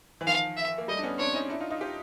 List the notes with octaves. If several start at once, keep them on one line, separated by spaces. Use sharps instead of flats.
E3
D#3 F3 F5
E5
A#3
G3 A3 D#5
D4
B3 C#4
C4 D4 C#5
C#4 D#4
D4 E4
D#4 F4
D#4 F4
F4 G4